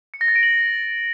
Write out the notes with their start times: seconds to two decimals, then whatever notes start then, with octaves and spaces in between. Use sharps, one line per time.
0.14 C#7
0.21 A#6
0.28 A6
0.36 D7
0.43 F#7